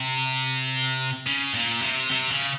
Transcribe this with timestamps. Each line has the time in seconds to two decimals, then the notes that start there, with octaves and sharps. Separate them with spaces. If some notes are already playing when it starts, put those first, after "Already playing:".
Already playing: C3
1.26 C#3
1.54 A#2
1.82 C3
2.11 C3
2.31 C#3